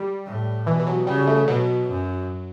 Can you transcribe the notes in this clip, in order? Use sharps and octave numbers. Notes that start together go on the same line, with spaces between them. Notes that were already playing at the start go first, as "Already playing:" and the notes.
Already playing: G3
A2
B2 E3
E3
F#3
C#3 G3
A3
B2 F#3
F#2